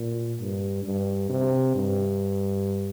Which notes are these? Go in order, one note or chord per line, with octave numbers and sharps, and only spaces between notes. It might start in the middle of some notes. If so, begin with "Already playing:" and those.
Already playing: A#2
G2
G2
C3
G2